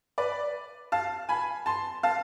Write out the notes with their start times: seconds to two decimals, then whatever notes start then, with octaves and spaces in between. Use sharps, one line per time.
0.18 B4 D5
0.92 F5 A5
1.29 G#5 B5
1.66 A5 C6
2.03 F5 A5